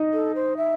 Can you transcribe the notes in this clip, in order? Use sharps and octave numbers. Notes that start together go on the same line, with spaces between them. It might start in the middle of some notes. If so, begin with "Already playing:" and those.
Already playing: D#4 D#5
A4
C5
E5